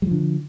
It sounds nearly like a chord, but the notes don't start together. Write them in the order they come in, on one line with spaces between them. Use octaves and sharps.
G3 F3 D3